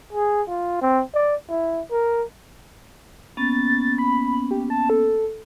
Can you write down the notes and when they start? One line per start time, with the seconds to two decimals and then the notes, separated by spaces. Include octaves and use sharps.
0.13 G#4
0.49 F4
0.81 C4
1.14 D5
1.49 E4
1.91 A#4
3.37 A#3 B3 C#4 A6
3.98 B5
4.51 G4
4.70 A5
4.90 A4